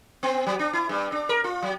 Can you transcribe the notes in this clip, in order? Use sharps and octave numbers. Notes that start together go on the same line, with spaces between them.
B3
F#3
D4
E4
G2
D4
A#4
F4
F#3